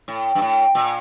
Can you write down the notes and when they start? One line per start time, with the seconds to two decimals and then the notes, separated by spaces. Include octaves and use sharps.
0.08 A2
0.35 G2
0.42 A2
0.75 A#2